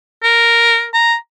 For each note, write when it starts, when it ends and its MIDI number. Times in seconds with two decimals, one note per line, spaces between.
0.23 0.86 70
0.94 1.15 82